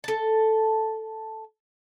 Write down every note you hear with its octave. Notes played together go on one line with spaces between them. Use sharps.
A4 A5